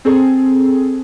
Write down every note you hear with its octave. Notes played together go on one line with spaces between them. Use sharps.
C4 G#4 A4